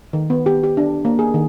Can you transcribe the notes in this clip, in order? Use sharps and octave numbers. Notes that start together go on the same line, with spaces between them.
D#3
B3
G4
G4
D4
A#3
G#4
D#3